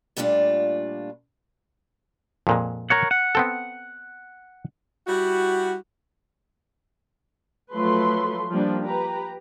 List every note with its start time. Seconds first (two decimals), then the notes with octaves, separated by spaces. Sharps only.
0.17 A#2 G3 A3 D4 F4
2.47 F2 A#2 G#3
2.90 A#4 C#5 F#5
3.11 F#5
3.35 B3 C4 A4
5.07 G3 E4 F#4
7.72 F3 F#3 A3 A4 B4 C6
8.51 F3 G3 A#3 D4
8.83 G4 B4 A#5